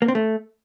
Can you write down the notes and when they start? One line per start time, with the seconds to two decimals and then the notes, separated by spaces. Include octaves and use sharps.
0.02 A#3
0.08 C4
0.15 A3